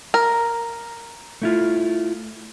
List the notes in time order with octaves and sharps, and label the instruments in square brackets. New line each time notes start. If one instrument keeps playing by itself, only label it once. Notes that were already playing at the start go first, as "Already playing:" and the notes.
[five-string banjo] A#4
[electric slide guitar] A3 E4 F4